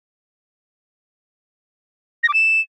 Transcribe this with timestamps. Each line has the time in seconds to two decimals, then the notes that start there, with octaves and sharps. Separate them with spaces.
2.23 A#6
2.29 D6
2.34 E7